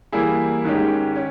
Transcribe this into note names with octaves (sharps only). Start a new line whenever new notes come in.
E3 G3 A#3 E4 G#4
G#2 D#3 G#3 C#4 G4
C#4